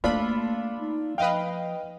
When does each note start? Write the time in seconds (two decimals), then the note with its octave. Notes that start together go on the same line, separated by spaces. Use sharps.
0.04 A3 A#3 D4 F4 A4 B5
0.79 D#4
1.18 F3 B4 D#5 F5 G5